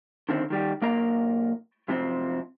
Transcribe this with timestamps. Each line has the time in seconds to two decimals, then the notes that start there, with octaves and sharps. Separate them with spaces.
0.29 D3 D#3 C4
0.50 D#3 G3 G4
0.82 B1 A#3 A#4 A#5
1.88 F#2 C3 F3 C4